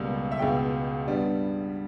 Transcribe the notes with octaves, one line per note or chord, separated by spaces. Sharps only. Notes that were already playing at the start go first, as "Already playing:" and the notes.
Already playing: C#2 B2 G3 A#3
E5
C#2 B2 G#3 G5
G2 G3 B3